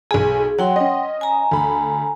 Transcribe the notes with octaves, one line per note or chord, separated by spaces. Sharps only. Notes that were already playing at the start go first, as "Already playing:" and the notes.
B1 G#4 G#5
F#3 F#5 G5 C6
C#4 D#5
G#5 A#5
D2 B5